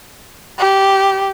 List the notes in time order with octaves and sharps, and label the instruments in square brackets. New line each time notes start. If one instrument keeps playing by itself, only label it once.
[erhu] G4